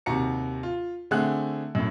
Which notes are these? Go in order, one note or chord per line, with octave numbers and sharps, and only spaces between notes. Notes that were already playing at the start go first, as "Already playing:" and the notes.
D#2 C3 F#4 A#5 C#7
F4
D3 A3 C4 G#4 F#5 F#6
F#2 A2